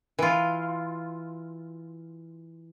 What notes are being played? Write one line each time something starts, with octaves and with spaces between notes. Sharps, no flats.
E3 F4